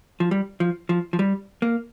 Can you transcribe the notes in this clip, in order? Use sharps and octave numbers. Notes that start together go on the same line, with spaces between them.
F3
G3
F3
F3
F3
G3
A#3